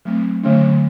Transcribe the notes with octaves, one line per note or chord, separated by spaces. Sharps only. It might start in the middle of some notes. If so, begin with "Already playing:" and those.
F#3 A3 C4
D3 F#3 A3 C#4